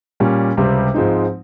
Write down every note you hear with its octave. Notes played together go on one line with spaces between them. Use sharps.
A#2 G3 A#3 C#4
C#2 C3 G3 C4
G#2 F3 G#3 C4 D#4